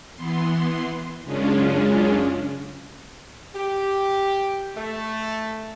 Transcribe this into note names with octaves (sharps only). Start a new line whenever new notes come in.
E3 B3 C6
F#2 C#3 G#3 C#4 D4 F4
G4
A3